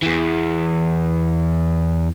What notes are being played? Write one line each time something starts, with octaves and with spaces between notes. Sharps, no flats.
E2 E3